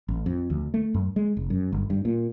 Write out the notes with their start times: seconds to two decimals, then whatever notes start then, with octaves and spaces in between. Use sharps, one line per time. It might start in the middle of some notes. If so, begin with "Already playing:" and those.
0.08 A1
0.26 F2
0.50 D2
0.74 A3
0.94 F#2
1.16 G#3
1.37 F1
1.50 F#2
1.73 G1
1.90 G2
2.05 A#2